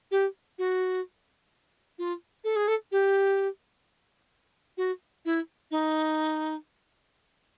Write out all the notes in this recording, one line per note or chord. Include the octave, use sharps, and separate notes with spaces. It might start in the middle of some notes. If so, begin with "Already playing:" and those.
G4
F#4
F4
A4
G#4
A4
G4
F#4
E4
D#4